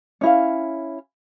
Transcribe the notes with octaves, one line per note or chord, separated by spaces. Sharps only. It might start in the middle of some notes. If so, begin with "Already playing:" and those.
C#4 E4 F5